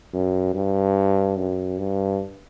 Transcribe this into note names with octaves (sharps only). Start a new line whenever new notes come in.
F#2
G2
F#2
G2